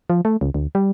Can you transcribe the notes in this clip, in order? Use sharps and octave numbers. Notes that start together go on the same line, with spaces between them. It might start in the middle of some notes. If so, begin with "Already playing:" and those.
F3
A3
C#2
D2
G3